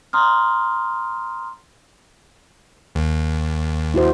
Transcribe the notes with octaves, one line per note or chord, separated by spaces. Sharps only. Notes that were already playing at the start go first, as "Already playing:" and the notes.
A#5 C6 D#6 F6
D#2
E4 F#4 C5